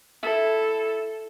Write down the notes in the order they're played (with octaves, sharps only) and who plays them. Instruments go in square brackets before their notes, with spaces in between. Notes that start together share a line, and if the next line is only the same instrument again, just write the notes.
[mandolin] E4 [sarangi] A4